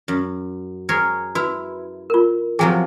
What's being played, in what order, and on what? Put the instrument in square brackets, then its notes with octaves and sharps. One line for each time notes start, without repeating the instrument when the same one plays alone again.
[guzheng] F#2
G#4 A#4 C#5
[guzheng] E4 [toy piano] F#4 B4
[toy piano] F4 A#4
[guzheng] C3 F3 F#3 [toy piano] G#4 G5 G#5